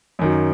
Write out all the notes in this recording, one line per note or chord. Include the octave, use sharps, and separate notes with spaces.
F#2 D#3 F#3